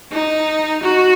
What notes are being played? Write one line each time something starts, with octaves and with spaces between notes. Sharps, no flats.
D#4
F#4